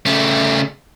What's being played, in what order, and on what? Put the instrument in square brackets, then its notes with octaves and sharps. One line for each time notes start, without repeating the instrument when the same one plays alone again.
[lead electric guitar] C#3 A3